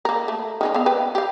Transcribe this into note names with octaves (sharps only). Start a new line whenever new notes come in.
A#3 A#4
A3
D#3 G#3 C#4
B3 A4 F5
B4 G5
G4 F5